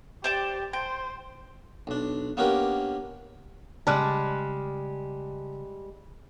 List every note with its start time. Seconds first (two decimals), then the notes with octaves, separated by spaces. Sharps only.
0.24 G4 C5 D5 G5
0.73 C5 G5
1.87 B1 D4
2.37 A#3 B3 C#4 D4 G4 A#4
3.87 C#3 G3 G#3 A5 F6 F#6